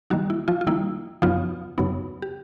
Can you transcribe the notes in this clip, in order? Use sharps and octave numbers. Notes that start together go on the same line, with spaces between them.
D#3 F#3 G3 A#3 D#4 F#4
E4
F3 F4
F4
D#3 G3 A#3 D#4 E4
F#2 C#3 F3 F#3 B3 D#4 F4
F#2 C#3 F#3 B3 D#4
G4